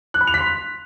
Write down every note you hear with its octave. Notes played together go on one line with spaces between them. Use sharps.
F#6
B5
F7
B6
C6